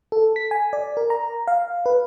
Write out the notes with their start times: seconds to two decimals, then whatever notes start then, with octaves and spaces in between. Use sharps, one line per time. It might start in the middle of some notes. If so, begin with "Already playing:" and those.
0.12 A4
0.36 B6
0.51 G#5
0.73 D5
0.97 A#4
1.10 A#5
1.47 F5
1.86 B4